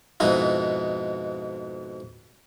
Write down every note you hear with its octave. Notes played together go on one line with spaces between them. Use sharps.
F2 G#2 B2 D#4 E4